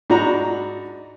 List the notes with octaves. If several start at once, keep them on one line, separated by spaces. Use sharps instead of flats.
G#2 D4 F#4 A#5 B5